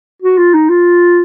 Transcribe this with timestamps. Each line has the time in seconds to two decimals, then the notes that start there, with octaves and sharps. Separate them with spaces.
0.22 F#4
0.38 F4
0.54 D#4
0.69 F4